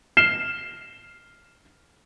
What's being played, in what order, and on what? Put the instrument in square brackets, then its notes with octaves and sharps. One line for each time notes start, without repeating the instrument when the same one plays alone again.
[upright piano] F6 C7 E7 G7